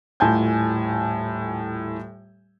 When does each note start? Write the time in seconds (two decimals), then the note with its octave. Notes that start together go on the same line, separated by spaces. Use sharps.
0.20 D#1 A2 F4 G#5 A5 G6